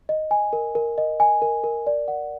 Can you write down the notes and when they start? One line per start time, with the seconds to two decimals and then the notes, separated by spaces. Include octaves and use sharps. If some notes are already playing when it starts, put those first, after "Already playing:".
0.09 D#5
0.31 G#5
0.53 A#4
0.75 A#4
0.98 D#5
1.20 G#5
1.42 A#4
1.64 A#4
1.87 D5
2.08 F#5